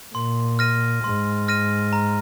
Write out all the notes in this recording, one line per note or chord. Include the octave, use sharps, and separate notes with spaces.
A#2 C6
F6 A#6 D#7
G#2 C6
F6 A#6 D#7
A#5